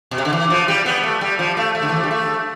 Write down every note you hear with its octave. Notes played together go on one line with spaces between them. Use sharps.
B2
C3
D3
E3
F3
G3
B3
A3
G3
F3
A3
A3
D3
E3
F3
G3
A3